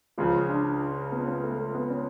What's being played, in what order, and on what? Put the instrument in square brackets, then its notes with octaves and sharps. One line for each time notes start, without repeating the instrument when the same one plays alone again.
[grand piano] C#2 C#3 F3 [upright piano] F4
[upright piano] D4
B3
C#4
B3
A3
A3
B3
C#4